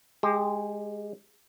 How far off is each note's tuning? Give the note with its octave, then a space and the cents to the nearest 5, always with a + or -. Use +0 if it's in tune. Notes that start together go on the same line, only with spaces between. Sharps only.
G#3 +0 G4 +25